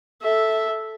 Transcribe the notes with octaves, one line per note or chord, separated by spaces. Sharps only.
A4 E5